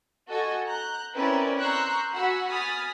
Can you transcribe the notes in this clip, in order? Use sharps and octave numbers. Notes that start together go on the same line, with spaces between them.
F#4 A4 D#5 G#5 C#6
A#5 F#6 G6
C4 C#4 E4 A#4 B4 D5
A#5 C6 C#6 E6 F#6 G6
F#4 F#5 G#5 B5 E6
G#5 B5 D#6 F6 A6